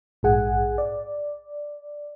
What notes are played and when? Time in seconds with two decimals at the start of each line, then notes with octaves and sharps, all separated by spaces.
0.23 A#1 G#2 G#4 F#5 G#5
0.78 D5